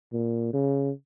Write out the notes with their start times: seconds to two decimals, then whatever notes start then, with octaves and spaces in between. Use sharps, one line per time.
0.12 A#2
0.53 C#3